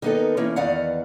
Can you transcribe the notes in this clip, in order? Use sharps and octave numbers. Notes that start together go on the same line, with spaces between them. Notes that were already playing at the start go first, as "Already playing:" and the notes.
D#3 A#3 B3 D#4 A4
E3 A#3 C#4
E2 D#3 B3 D5 F5 F#5